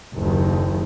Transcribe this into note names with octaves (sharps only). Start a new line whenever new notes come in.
F#1 D#2